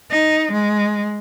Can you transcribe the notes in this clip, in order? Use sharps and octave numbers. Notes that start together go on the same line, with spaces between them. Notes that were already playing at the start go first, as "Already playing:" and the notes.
D#4
G#3